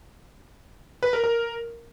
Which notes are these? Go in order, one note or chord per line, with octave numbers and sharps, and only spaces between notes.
B4
A#4
A#4